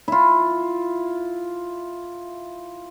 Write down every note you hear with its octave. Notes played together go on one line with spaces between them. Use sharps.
E4 F4